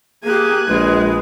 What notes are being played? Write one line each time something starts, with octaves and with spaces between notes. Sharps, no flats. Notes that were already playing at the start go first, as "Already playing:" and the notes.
A#3 G4 G#4 G#5 F#6
A#1 G#3 B4